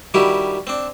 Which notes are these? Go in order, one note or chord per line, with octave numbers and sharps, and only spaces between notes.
D#3 G3 E4 F#4 G4
C4 D4